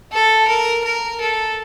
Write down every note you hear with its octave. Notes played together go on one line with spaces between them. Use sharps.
A4
A#4
A#4
A4